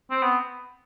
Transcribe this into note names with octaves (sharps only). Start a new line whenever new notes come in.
C4
B3